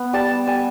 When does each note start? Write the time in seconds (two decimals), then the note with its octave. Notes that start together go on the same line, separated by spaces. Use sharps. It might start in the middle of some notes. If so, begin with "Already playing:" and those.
Already playing: B3
0.13 G3 A5
0.47 G3 G#5